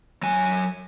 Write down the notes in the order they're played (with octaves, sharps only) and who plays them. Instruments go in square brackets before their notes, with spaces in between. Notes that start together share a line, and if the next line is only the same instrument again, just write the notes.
[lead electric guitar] F#3 G#5